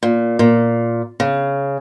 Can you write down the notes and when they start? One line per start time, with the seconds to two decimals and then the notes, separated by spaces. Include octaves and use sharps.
0.03 A#2
0.39 A#2
1.20 C#3